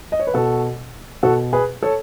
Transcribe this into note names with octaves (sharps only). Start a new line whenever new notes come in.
D#5
C#5
B4
B2 F#4 A4
B2 F#4 A4
G#4 B4
A4 C#5